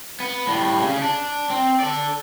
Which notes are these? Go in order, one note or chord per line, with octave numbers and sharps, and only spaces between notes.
B3
A2 G3
C#3
D4
C4
A4 D5